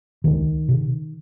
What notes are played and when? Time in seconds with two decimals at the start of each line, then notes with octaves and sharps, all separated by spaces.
0.24 C#2 D#3
0.69 C3